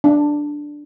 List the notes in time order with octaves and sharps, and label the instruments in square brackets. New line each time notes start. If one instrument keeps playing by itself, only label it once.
[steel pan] D4